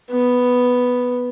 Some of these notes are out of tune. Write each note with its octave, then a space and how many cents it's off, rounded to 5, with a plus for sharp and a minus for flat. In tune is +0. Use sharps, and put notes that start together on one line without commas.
B3 +0